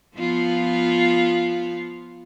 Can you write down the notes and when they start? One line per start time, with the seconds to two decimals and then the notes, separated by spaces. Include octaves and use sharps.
0.17 F3 B3 F4